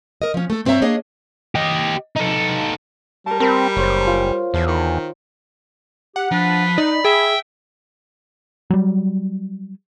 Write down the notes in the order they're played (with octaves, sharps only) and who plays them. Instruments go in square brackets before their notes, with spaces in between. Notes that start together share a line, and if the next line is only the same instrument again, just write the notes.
[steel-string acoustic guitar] A#4 D#5
F3 C#4
A3 A4
G2 C4 C5 C#5 E5 A#5
A#3 D4 G#4 C#5 D#5
[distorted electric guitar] G4 D#5
D#4 A4
[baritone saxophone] G3 [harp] A#4 A5
[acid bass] C4 [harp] A#4 B5
[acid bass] F#1 [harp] C5 C#5
[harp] F4
[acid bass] E2 [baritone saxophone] F3
[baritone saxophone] D#3
[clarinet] G4 [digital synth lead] F#5
[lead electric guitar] F3 [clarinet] D4 [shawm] B4
[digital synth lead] D#4 [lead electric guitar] D5 [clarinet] B5
[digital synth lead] G#4 [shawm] E5 [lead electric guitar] G5
[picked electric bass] F#3 G3